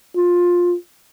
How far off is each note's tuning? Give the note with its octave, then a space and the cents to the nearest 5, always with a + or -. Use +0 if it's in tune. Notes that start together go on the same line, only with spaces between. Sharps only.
F4 +15